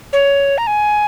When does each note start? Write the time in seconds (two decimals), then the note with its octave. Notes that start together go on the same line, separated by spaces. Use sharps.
0.13 C#5
0.58 A#5
0.67 G#5